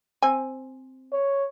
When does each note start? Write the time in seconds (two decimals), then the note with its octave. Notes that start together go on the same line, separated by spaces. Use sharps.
0.22 C4 G#5
1.12 C#5